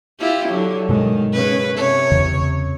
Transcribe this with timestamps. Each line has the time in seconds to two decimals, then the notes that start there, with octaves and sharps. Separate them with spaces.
0.20 E4 F4 G4
0.49 D3 F#3
0.89 G2 B2 D#3 G#3
1.33 C#3 B4
1.74 C3 C#5
2.11 E2 C#3